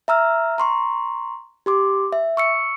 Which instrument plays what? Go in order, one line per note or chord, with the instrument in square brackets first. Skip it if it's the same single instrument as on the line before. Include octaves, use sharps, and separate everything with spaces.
[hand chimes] E5 A#5 E6 F6
A#5 C6 C#6
G4 C6 D6
E5
C#6 E6 C#7